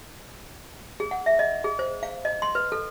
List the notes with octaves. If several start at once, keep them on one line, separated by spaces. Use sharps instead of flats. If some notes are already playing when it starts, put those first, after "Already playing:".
G#4
F#5
E5
D#5
G#4
C5
F5
D#5
C6
B4
A4